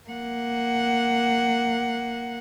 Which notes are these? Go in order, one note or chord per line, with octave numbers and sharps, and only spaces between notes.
A#3 F#5